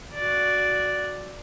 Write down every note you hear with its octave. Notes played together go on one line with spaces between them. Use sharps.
F#4 D5